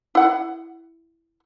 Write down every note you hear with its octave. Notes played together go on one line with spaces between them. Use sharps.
E4 F#5